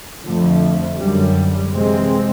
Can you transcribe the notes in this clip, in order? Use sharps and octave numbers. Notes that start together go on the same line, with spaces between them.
F2 D3 F3 A3
F#2 D3 G3
C3 E3 G#3 C4